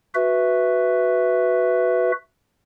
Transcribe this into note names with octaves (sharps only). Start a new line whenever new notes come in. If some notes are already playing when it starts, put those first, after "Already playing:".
F#4 B4 E5